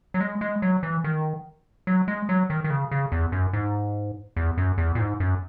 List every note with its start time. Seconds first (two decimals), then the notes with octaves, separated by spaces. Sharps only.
0.14 F#3
0.21 G#3
0.41 G#3
0.62 F#3
0.83 E3
1.04 D#3
1.87 F#3
2.08 G#3
2.29 F#3
2.50 D#3
2.64 D#3
2.70 C#3
2.91 C#3
3.12 E2
3.32 F#2
3.53 G#2
4.37 E2
4.58 F#2
4.78 E2
4.95 A#2
4.99 G#2
5.20 F#2